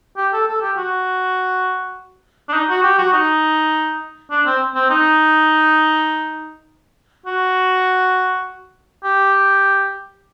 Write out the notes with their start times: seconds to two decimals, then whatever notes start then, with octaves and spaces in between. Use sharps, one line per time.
0.17 G4
0.33 A4
0.48 A4
0.61 G4
0.77 F#4
2.49 D4
2.53 D#4
2.69 F#4
2.83 G4
2.98 F#4
3.13 D#4
4.31 D4
4.46 C4
4.75 C4
4.90 D#4
7.26 F#4
9.04 G4